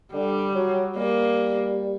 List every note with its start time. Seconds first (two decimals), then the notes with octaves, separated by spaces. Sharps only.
0.13 D3 G3
0.55 F#3
0.96 G3 A#3